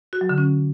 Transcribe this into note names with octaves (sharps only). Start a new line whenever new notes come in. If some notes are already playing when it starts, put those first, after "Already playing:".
F#4
F#3
D3
C#4